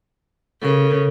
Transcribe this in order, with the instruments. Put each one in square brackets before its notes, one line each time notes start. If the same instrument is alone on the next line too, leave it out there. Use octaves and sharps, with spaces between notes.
[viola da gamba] C#3 [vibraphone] A4 A#4